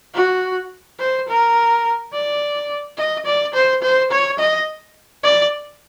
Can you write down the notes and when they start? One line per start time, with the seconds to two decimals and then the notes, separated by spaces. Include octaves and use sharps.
0.14 F#4
0.99 C5
1.28 A#4
2.13 D5
2.97 D#5
3.26 D5
3.54 C5
3.82 C5
4.11 C#5
4.39 D#5
5.24 D5